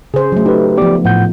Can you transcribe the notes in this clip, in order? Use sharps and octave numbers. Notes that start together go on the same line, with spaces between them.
C#3 G#4 C5
F#3 A3
D#4 G4 B4
F3 B3 G4 D5 D6
A2 F3 F#5 G6